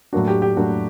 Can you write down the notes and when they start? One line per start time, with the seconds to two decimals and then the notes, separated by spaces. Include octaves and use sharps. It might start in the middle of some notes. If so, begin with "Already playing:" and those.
0.13 A2 F#3 A#3 D4 F#4
0.28 G4
0.42 G4
0.57 A2 F#3 A#3 D4 F#4